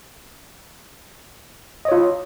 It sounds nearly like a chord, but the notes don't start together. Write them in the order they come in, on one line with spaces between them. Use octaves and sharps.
D#5 C#5 F4